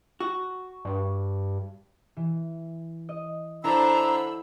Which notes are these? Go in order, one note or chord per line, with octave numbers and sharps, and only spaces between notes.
F#4
G2
E3
D#5
D3 D4 E4 A4 C5 A#5 B5 E6